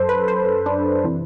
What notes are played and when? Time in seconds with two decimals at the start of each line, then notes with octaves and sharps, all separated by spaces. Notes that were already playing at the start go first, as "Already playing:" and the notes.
Already playing: F#2 A4 C5
0.09 B4
0.28 C5
0.66 D4
1.04 C3 E3